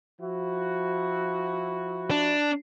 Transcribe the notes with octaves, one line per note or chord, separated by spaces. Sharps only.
F3 E4 F#4
D4